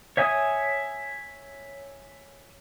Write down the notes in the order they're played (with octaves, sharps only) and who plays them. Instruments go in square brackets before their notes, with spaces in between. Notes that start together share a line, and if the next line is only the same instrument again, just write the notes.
[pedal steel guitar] C#5 E5 G#5 D#6